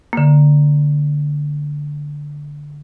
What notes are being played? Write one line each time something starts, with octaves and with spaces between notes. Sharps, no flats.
D3 A#3